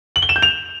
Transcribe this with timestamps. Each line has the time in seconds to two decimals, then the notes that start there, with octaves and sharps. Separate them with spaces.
0.16 F#7
0.22 G7
0.29 E7
0.36 G6
0.42 F7